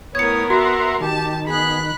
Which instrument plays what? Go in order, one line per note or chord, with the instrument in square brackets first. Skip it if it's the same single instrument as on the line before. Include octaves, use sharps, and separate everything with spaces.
[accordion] A2 C#5 D#6 [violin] B3 A#4 [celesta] G#6 C#7
[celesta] F#4 [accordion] E5 F#5 A#5 [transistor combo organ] C6
[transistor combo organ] D#3 [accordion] G4 [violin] A5
[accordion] B3 G#4 [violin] B5 F#6